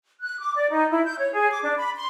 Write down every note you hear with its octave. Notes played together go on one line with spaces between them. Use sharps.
F#6
D6
D5
D#4
E4
G6
C#5
G#4
D6
D4
B5
C6